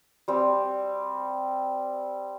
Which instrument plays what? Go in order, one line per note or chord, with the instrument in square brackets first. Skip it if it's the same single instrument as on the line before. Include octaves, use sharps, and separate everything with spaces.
[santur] G3 C4